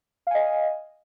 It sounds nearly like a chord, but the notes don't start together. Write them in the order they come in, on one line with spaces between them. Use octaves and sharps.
F5 G#5 D#5